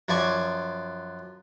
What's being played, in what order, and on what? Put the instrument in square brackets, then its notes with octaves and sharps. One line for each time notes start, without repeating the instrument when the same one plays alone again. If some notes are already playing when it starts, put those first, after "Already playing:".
[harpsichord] F#2 F3 D5 G#5 C#6